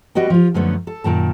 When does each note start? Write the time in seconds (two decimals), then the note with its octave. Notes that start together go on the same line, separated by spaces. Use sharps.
0.15 G3 B3 F#4 D#5 G5
0.30 F3 F4
0.54 F#2 D3 F3 A3 B3 C#4
0.87 A4
1.04 F#2 A#2 D#3 A5